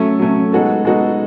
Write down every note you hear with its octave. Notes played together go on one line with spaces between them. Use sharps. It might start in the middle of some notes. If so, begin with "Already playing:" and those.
Already playing: F#3 A3 C#4
F#3 A3 C#4
G#3 B3 D#4 F#4 A4
G#3 B3 D#4 F#4 A4